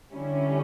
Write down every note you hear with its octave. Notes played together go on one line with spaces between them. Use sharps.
D3 G3 C#4 E4